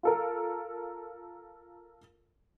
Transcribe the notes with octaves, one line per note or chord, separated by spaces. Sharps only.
F4 A4 A#4